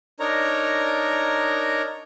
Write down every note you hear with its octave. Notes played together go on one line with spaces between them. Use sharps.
D4 D#4 A#4 C#5 A#5